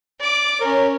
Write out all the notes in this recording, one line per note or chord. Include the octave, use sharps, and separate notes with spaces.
D5 D6
C#4 A#4 C#5